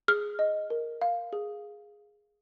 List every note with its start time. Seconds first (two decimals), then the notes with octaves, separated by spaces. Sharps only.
0.08 G#4 F6
0.39 D#5
0.70 A#4
1.02 F5
1.33 G#4